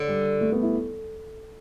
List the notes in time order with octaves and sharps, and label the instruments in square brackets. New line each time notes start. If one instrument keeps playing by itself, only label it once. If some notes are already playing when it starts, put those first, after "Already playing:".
Already playing: [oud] D3
[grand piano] G3
A3
B3
E4